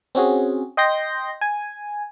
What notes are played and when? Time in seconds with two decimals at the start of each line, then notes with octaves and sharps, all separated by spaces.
0.15 C4 C#4 F#4 G#4
0.77 D#5 G5 C6 G6 A#6
1.41 G#5